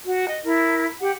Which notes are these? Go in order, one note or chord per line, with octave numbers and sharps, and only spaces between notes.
F#4
D#5
E4 A#4
G4 F#5